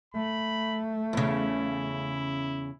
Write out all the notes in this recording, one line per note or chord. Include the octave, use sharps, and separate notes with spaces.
A3 B5
E2 C#3 E4